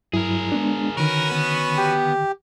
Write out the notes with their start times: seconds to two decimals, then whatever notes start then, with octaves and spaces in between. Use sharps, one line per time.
0.14 G2 F#3 E4 G#4 A#4
0.52 G#3 B3 D4
0.98 D3 D#3 C#4 F#4 A#4 B4
1.31 B3
1.77 G4